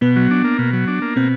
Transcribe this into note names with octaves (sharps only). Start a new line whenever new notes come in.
B2 B3
F#3
D4
A#3
B2
F#3
D4
A#3
B2 C4